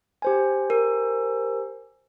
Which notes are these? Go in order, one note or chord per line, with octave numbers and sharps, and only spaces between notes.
G4 C5 G#5
A#4